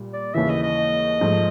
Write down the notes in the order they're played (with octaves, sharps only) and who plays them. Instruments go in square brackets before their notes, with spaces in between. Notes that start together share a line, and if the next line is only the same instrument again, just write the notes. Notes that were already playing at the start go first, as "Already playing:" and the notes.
Already playing: [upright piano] A#2 G3
[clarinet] D5
[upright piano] D#2 C#3 E3 [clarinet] E5
[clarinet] D#5
D#5
[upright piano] G#2 F3 A3